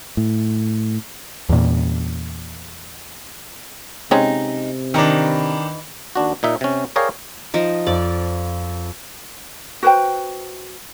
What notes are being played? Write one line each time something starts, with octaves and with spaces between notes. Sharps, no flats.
A2
E2 A#2
C3 G#3 C4 C#4 D#4
D#3 E3 D4 D#4
D#2 D4 F#4
A#2 D#4 E5
C3 C#4
G#4 A#4 C#5 D5 F5 G5
F3 D#4 D7
F2 D5
F#4 B4 C5 G5